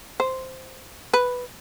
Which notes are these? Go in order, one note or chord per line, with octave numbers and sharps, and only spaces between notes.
C5
B4